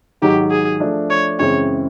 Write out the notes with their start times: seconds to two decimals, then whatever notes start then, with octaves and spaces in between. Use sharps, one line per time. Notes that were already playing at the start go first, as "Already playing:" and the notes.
0.22 G#2 D#3 F#3 G4
0.51 G#4
0.80 F3 A3 D4
1.10 C#5
1.39 F#2 C#3 E3 G#3 C4 C#5